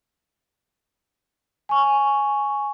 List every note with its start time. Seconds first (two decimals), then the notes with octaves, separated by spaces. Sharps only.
1.69 G#5 C#6